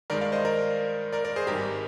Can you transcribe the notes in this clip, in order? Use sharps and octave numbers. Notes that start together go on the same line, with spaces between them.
G2 D#3 G#3 A#4 D5
D5 F5
C5 D#5
A#4 D5
A#4 D5
A#4 D5
G#4 C5
G#1 G2 D#3 G3 G4 A#4